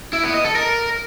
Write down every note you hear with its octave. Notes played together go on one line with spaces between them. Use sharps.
E4
B3
D#5
A4
A#4